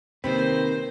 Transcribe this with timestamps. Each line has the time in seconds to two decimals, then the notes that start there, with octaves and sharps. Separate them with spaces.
0.24 C3 D#3 A#3 C4 D#4 B4 C5